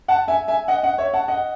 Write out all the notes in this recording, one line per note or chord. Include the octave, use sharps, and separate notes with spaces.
F#5 A5
E5 G#5
E5 G#5
D#5 F#5
D#5 F#5
C#5 E5
F#5 A5
D#5 F#5